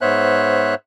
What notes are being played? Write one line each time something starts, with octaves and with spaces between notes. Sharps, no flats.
G#2 B3 C5 C#5 E5 F#6